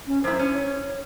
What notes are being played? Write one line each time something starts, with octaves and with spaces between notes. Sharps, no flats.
C#4
F#2 E4 C5
C#4
C#5